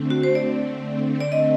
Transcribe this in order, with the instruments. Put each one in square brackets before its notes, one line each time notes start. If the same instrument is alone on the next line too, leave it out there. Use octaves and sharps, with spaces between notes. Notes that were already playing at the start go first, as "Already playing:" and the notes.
Already playing: [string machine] D3 A3 C4
[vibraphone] F#4
C5
D5
D5
D#5